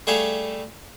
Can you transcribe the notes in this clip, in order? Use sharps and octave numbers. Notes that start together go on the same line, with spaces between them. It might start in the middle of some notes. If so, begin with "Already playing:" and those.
G3 A3 G#4 A4 C#5 F5